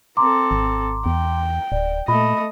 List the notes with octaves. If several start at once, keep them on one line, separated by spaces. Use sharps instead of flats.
C4 A4 A#5 C6 D6
G#1
E2 G5
D1 D5
A#2 A3 D#5 B5